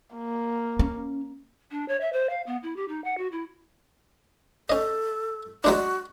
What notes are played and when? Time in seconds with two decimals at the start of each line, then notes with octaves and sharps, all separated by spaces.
0.15 A#3
0.79 C#4
1.71 D4
1.88 C#5
2.01 E5
2.13 C5
2.30 F5
2.47 B3
2.63 E4
2.76 G4
2.88 D#4
3.04 F#5
3.18 F#4
3.32 E4
4.70 C#4 A4 D#5
5.64 F#3 G#3 D4 F#4